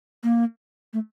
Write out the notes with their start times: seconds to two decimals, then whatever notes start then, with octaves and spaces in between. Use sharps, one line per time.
0.23 A#3
0.93 A3